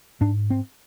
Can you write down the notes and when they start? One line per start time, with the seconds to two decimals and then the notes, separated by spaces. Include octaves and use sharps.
0.21 G#2 D4
0.50 C4